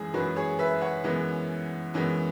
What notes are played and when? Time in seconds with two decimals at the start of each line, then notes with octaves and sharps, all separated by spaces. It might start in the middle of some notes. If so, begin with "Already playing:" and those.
Already playing: F#2 E3 G#3 G#4
0.14 F#2 E3 G#3 F#4 B4
0.36 G#4 C#5
0.59 B4 E5
0.81 C#5 F#5
1.04 F#2 E3 G#3 B3
1.94 F#2 E3 G#3 B3